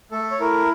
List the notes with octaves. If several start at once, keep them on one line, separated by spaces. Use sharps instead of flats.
A3 A4
C#5
E4 A#4